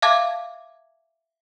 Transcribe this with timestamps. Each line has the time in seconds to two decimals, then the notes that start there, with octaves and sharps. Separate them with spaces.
0.02 E5 F5 A5 D6 G#6